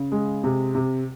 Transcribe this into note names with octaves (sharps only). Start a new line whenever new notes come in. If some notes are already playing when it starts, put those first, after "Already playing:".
Already playing: C#3
G#3
C3
C3